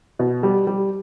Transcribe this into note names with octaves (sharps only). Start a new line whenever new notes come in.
B2
G3
G3